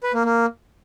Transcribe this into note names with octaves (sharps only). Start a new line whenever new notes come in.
B4
A#3
A#3